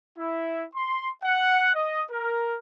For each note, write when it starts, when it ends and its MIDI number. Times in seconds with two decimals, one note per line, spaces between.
0.19 0.64 64
0.75 1.10 84
1.24 1.72 78
1.75 2.02 75
2.11 2.56 70